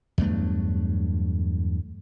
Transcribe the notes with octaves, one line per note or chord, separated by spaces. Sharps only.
E2 G2 F#3 A3